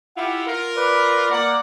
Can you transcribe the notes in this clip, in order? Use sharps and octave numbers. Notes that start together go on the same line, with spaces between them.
E4 F4 G4 F#5
F4 A#4
B4 D5
A#3 D5 F#5